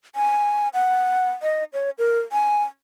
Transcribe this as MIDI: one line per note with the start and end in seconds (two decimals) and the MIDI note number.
0.15 0.69 80
0.74 1.31 78
1.42 1.64 75
1.73 1.90 73
1.98 2.20 70
2.32 2.63 80